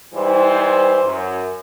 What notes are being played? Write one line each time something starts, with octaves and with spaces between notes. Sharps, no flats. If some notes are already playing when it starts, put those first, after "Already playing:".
G#2 E3 G3 E4 C5
F#2